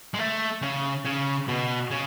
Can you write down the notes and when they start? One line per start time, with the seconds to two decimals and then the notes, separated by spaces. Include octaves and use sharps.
0.14 G#3
0.19 A3
0.62 C#3
1.05 C#3
1.49 B2
1.91 C#3